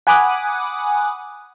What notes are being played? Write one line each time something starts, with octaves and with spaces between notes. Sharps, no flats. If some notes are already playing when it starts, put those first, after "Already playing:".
F#5 G#5 B5 D6 D#6 F#6